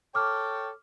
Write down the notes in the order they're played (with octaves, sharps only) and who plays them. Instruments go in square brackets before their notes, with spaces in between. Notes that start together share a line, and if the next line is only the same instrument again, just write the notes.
[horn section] A4 C#5 G5 [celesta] D6 F6